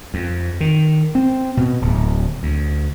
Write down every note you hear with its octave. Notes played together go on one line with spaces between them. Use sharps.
F2
D#3
C4
B2
D1
D2